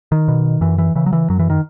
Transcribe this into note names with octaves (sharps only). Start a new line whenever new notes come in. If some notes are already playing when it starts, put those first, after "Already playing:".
D#3
B2
F#2 E3
E3
C#3 E3
F#3
E3
F#2 F#3
E3
D#3